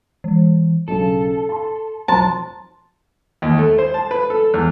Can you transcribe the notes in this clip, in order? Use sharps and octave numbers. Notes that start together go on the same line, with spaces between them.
E3
B1 C#3 A4
A5 C6
B1 F2 C5 A5 A#5 C6
D#2
A3
C5
A5
B4
A4
E2